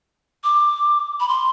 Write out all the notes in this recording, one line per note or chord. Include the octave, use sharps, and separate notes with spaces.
D6
B5
C6